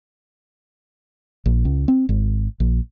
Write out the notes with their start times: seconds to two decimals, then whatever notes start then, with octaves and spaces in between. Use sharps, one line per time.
1.46 A#1
1.65 C#2
1.88 C4
2.09 G#1
2.60 A#1